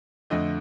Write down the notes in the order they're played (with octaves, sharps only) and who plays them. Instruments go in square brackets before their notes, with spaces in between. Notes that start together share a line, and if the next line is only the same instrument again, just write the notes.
[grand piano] F2 D3 A3 D#5